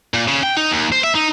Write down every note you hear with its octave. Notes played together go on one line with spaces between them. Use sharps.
A#2
C#3
G5
D#4
D#2
C5
E5
D#4